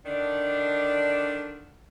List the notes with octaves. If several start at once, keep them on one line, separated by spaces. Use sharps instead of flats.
D3 D#3 D4